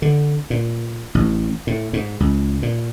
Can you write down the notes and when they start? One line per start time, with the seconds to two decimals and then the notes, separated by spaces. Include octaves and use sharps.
0.02 D3
0.50 A#2
1.15 A1
1.67 A2
1.93 G#2
2.20 C#2
2.63 A#2